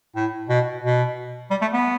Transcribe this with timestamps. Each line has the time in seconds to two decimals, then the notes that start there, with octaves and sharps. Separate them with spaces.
0.16 A2
0.49 B2
0.83 B2
1.50 G3
1.61 A3
1.73 B3